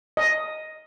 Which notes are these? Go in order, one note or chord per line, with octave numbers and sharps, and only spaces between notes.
D#5